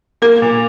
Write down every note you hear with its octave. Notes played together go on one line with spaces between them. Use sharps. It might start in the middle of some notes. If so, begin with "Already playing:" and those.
A#3 A#4
A#2